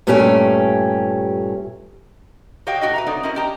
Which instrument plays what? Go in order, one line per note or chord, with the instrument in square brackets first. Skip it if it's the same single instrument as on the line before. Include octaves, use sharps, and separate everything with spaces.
[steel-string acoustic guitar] G2 A#2 A3 C#4 G4 G#5
[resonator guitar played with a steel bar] F#4 G4 C#5 D#5 F5 G5
A2 F#4 G4 D#5
B4 E5 A#5
C4 D#4 F#4 A4 C#5 D5
C4 C#4 E4 A#4 D#5
C#4 G4 A5 A#5